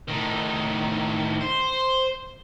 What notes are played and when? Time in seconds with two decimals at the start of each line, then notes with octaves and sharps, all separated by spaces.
0.08 A2 D#3
1.41 C5